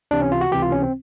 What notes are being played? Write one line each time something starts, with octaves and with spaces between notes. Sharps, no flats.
C#2 C3 E3 D4
C#4
F4
F#4
C#2 C3 E3 G4
F4
C#4
C4